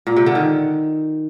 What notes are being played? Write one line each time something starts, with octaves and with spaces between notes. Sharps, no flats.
A#2
C3
D3
D#3